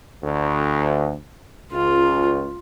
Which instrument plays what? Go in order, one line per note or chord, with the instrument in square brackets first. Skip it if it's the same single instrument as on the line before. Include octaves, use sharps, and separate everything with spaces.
[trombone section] D2
[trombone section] C#2 [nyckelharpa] F4